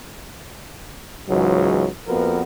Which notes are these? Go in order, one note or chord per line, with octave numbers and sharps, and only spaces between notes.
C#2 G#2 E3 F#3
F2 A#3 B3 F#4 A#4 B4